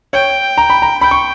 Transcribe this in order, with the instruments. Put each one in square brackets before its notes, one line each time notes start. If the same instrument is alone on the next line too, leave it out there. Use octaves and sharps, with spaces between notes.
[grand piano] C#5 [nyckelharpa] G5
[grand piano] A#5
B5
A#5
[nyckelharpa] G5 [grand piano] B5
[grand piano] C#6